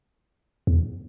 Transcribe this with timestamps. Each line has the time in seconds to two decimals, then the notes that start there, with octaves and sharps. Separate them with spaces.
0.67 E2